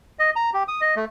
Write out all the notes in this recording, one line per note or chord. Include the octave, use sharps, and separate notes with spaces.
D#5
A#5
G4
D#6
D#5
A3